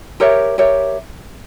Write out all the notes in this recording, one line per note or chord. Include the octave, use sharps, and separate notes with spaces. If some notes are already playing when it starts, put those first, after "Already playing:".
G4 A#4 C#5 E5
G4 A#4 C#5 E5